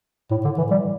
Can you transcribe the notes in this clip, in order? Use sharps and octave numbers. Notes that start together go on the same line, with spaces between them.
A2
D3
E3
G3